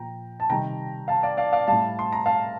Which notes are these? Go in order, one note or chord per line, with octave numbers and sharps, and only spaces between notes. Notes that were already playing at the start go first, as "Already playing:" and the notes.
Already playing: A#2 F3 G5 A#5
A5
C3 D#3 G3 G5 A#5
F5 A5
D5 F5
D5 F5
D5 F5
A2 G3 F5 A5
C6
A#5
F5 A5